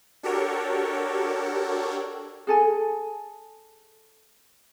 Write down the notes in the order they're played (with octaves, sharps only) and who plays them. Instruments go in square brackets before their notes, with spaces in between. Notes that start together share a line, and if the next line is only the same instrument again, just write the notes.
[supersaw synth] D4 F#4 G4 A4 A#4 C#5
[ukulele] G#4 A4 G#5